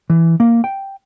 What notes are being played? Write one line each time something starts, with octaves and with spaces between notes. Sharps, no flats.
E3
A#3
G5